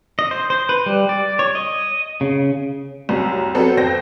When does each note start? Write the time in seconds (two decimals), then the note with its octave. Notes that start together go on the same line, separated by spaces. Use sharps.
0.19 D#5
0.31 C5
0.50 C5
0.69 B4
0.86 G3
1.09 D5
1.39 C#5
1.55 D#5
2.21 C#3
3.09 C2 F#2
3.55 F#3 B3 C4 A4 C5
3.77 F2 C5 G5 A#6